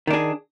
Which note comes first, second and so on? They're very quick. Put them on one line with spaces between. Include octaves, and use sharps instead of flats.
D#3 D4 G#4